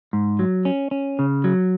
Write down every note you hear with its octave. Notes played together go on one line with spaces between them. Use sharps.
G#2
F#3
C#4
C#4
C#3
F#3